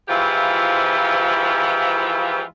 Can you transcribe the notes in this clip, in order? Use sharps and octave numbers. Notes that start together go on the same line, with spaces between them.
G#2 E3 F3 E4 F4 G4